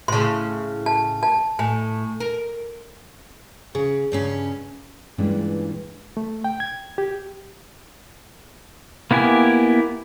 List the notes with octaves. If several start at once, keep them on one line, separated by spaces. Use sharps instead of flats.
A2 C#3 C6
A5
A5
A2 G#5
A#4
C#3 G#4
G2 C#3 C#4
G2 A#2 E3 G#3 C#4 D4
A3
G5
G#6
G4
A#3 B3 E4 G4 G#5